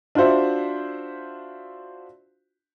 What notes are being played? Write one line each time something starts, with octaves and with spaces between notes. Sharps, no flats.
D4 F4 F#4 C5 E5